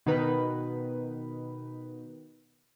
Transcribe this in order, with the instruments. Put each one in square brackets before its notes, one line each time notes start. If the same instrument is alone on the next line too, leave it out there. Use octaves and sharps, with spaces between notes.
[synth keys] B2 D#3 D#4 B4